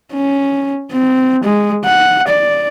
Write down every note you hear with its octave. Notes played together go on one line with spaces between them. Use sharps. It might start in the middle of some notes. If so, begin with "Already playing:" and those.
C#4
C4
G#3
F#5
D5